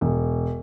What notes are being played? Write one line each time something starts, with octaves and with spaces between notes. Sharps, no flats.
E1